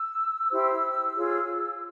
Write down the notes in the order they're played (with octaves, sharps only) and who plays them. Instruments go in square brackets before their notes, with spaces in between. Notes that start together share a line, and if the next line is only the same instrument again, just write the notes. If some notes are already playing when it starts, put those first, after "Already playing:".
Already playing: [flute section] E6
E4 G4 C5
F4 G#4 C#5